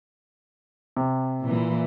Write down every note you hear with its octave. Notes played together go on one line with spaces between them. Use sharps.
C3
A#2 E3